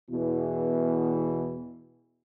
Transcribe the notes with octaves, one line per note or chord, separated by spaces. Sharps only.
E2 B2 E3